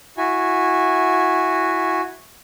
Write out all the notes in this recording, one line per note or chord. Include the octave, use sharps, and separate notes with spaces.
E4 F#4 G#5